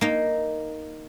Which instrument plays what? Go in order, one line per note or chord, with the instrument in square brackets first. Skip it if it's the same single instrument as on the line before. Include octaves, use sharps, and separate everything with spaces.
[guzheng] A#3 D#4